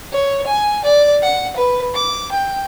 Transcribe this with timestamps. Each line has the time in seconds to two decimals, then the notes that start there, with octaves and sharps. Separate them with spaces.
0.12 C#5
0.47 G#5
0.85 D5
1.23 F#5
1.56 B4
1.95 D6
2.32 G5